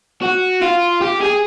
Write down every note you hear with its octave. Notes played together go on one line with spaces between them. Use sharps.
F#4
F4
G4
G#4